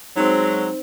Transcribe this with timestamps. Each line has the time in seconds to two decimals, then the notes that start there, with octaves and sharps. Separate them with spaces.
0.16 F#3 G#3 C4 D#4